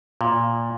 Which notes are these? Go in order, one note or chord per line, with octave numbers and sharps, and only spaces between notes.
A#2